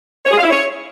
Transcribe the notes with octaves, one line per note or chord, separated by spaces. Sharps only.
C#5
G#4
F5
E4
C#5